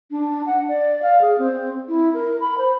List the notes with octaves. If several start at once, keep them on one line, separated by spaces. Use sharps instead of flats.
D4
F#5
D5
F5
G#4
C4
E4
A#4
B5
C5